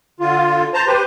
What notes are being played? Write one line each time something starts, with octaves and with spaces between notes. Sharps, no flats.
D3 F4
C5 A5 A#5
G4 B4 C5